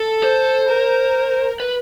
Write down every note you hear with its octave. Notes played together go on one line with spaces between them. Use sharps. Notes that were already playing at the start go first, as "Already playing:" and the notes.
Already playing: A4
C5
A#4
B4